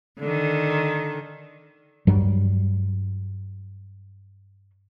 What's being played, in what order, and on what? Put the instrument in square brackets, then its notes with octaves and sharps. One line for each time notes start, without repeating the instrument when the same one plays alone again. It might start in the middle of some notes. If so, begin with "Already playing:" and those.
[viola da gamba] D3 D#3
[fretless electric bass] G2 F#3 G3